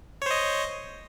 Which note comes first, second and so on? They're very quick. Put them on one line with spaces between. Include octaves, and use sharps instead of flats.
C#5 C5 D#5